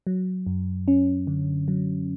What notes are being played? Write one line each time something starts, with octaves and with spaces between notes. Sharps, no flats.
F#3
F#2
C#4
D3
F#3